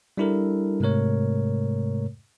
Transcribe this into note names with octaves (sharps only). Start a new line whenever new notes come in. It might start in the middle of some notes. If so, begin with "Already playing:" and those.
G3 D4 E4 A4 A#4
G#2 C3 G#3 A3 A#4 C#5